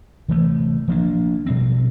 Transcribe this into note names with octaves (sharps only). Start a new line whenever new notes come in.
C3 E3 A3
F3 A#3 D4
B2 G3 C4